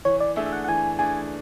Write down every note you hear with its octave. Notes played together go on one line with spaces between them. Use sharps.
E3 C#5
D5
A3 D4 G#4 E5
E5
F#5
F#5
E3 G#5
A3 D4 G#4 G#5